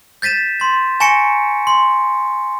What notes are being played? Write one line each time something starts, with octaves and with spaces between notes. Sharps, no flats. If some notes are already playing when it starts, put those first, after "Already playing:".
G6 A6 B6 D#7 E7
C6 A6
G#5 A#5 C#6 A#6 C#7 D7
C6